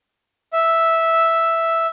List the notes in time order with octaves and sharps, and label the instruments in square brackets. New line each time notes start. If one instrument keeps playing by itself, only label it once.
[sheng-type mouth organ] E5